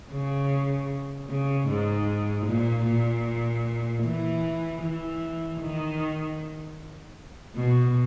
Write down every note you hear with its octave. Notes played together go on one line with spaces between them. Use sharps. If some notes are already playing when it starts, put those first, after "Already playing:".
C#3
C#3
G#2
A#2
A#2
E3
E3
D#3
B2